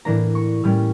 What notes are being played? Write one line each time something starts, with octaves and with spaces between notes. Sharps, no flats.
A2 E3 A#3 D4 A#5
C#6
A2 G3 A#3 C#4 F6